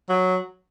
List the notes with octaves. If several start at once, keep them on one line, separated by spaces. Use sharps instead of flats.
F#3